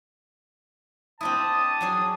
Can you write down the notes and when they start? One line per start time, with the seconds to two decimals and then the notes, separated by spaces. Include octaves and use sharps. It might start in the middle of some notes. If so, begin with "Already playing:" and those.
1.21 C4 D4 E4 A5 D#6
1.81 F#3 D4 G#4